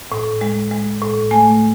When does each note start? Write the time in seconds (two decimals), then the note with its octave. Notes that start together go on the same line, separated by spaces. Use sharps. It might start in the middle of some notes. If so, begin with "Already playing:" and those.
0.12 A2
0.41 G#3
0.71 G#3
1.02 A2
1.31 A3 G#5